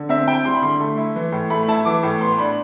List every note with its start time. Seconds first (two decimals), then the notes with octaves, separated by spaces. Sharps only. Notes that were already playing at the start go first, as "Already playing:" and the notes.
Already playing: D3
0.09 C4 E5
0.27 E4 G5
0.45 G3 C6
0.55 B5
0.62 D3 C6
0.80 A3
0.98 E4
1.16 E3
1.32 A2
1.50 A3 B5
1.68 E4 A5
1.85 E3 D6
2.03 A2
2.21 B3 C6
2.38 D4 B5